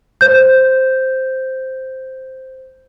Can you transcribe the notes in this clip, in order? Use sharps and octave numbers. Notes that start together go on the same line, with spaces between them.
C5 G6